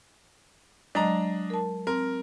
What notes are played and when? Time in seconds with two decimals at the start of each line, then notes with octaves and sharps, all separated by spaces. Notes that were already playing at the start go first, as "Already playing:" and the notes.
0.95 F#3 G#3 D4 D#5 A#5
1.50 A#4 A5
1.87 C4 A#4